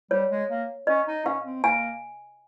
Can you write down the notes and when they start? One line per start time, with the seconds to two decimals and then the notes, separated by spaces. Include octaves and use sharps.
0.11 G3 C#5
0.31 G#3
0.50 A#3
0.87 C#4 D#5
1.07 D#4
1.25 C#4 F5
1.45 C4
1.63 A#3 G#5